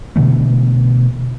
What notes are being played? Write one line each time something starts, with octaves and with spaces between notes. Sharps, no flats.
B2 D3 E3 A3